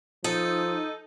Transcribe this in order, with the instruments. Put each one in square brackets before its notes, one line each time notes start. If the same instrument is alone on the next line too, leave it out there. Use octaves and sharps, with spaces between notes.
[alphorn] F3 [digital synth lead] D#4 [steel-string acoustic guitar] A4